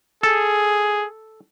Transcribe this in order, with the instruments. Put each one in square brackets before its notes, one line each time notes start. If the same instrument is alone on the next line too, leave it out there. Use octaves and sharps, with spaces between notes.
[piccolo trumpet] G#4 [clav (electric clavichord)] A4